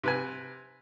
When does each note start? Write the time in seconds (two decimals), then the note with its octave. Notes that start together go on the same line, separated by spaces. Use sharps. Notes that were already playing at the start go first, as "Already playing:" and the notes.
0.04 C3 B4 G#5